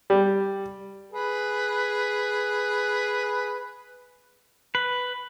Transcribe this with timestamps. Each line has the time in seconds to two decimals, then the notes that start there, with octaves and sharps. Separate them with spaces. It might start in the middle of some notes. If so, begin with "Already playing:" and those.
0.10 G3
1.12 G#4 B4
4.75 B4